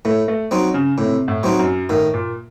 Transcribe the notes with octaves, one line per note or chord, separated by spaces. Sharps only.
A2 A3
A3
F#3 C4 D#4
C#3
A2 C3
A2
F#3 C4 D#4
F#2
A2 D#3
A#2